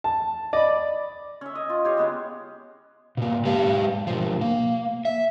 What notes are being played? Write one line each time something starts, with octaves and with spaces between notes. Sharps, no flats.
A5
D5 D#5 B5
C#4 E5
D#5
F4
G4 C#5 F5
G#3 B3 C#4
B2 A#3
G#3 G4 B4 F5
B2 F3
A#3
E5